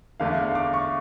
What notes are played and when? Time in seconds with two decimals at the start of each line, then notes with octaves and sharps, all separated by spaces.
0.20 E2 D3 A3 F5
0.38 F5
0.55 D6
0.74 C#6